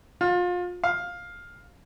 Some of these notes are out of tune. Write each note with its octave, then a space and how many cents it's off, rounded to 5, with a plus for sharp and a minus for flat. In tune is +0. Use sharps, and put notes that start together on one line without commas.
F4 +30
F5 +10